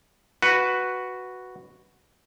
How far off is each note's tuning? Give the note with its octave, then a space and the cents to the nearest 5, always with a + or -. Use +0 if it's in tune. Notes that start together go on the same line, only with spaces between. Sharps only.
F#4 +0 B4 +0